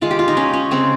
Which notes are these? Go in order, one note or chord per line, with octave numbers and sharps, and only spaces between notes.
D#3 G#3 F4
G4
F4
D#4
C#4
C#4
C#3 G#3 C4